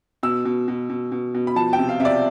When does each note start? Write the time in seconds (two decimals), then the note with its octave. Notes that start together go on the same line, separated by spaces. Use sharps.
0.23 B2 E6
0.45 B2
0.68 B2
0.90 B2
1.12 B2
1.34 B2
1.47 B5
1.55 F3 A5
1.73 G5
1.78 C3
1.89 F5
2.00 C3 E5
2.05 D5